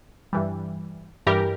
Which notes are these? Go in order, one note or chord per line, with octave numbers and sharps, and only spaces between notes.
G2 E3 G3
G2 E3 G3 G4 A#4